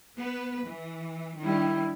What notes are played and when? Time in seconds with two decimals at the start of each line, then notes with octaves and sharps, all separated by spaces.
0.17 B3 B4
0.66 E3
1.40 D#3 G3 D4 E4